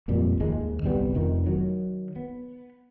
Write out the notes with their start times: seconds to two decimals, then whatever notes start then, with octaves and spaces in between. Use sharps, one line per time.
0.08 G#1 F2 A#2 G3
0.40 D#2 G#2 G#3
0.83 G1 C2 G3 B3
1.14 F1 F2 D#3
1.46 D#3 F#3
2.16 B3